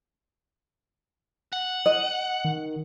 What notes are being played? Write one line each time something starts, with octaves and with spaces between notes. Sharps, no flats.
F#5
D#5
D#3